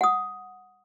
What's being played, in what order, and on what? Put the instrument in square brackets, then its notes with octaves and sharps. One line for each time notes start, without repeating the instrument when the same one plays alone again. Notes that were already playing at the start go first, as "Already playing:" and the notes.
[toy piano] F#5 D#6